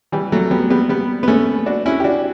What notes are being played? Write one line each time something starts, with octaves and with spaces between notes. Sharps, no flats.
E3 G3
F#3 A3
G3 B3
G3 B3
G3 B3
B3
A3 C#4
D4 F#4
C#4 E4
G4
D4 F#4